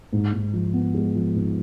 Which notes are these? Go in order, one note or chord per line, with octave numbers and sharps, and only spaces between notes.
G#2
G#2
F3
B3
G#3
F3
G#2